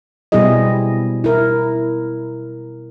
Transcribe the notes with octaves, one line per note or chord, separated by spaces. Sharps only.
B2 G3 C4 E4 G#4 D#5
E4 A#4